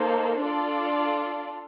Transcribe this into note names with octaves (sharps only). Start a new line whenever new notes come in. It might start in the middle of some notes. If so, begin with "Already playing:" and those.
Already playing: A#3 D#4 A4 C5
D4 F4 A4 D5